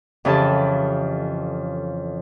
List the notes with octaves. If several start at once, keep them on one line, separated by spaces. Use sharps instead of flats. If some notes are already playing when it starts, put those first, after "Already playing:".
F2 C#3 E3 G4 A4 A5